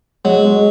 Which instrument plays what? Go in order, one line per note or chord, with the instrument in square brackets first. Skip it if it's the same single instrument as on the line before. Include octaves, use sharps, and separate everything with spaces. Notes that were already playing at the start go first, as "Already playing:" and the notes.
[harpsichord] F#3 [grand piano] G#3
[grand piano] G#3